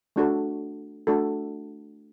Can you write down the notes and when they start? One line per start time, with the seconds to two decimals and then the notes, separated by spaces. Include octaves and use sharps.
0.16 A3 D4 F#4 A4
1.07 A3 D4 F#4 A4